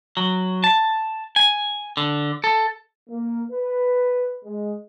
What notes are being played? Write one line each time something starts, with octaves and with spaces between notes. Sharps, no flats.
F#3
A5
G#5
D3
A4
A#3
B4
G#3